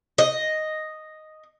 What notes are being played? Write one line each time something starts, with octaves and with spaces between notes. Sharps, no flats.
D#5